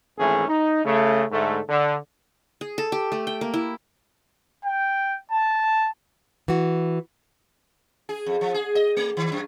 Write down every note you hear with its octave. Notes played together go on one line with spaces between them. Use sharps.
G#1 E3 A3 C#4 G#4
D#4
C#3 A3
G#2 D3 A3
D3
G#4
A4
G4
A3
G5
A#3
E4
G5
A5
E3 F#4
G#4
F2
F3
G#4
D#5
A3
D#3
F#2